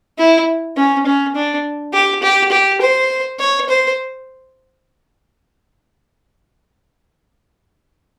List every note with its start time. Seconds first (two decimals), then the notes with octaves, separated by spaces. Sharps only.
0.18 E4
0.77 C#4
1.06 C#4
1.35 D4
1.93 G4
2.22 G4
2.51 G4
2.81 C5
3.39 C#5
3.69 C5